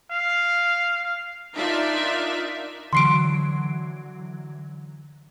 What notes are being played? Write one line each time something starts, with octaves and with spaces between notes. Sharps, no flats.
F5
D4 D#4 F4 A#4 D5 E5
D3 E3 F#3 C6 C7 D7